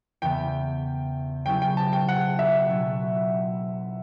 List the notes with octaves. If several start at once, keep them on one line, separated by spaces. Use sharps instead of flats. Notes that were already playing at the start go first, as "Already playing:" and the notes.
E2 C#3 E3 B3 G5
C#3 F#3 C#4 E4 G4 G5
G5
A5
G5
F#5
E5
B2 F#3 C#4 F#4